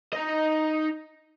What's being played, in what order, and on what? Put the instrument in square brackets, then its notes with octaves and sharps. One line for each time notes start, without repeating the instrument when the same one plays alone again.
[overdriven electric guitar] D#4 D#5